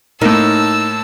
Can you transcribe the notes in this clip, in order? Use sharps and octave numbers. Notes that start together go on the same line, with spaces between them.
A2 A#3 D#4 A#4 A5 E6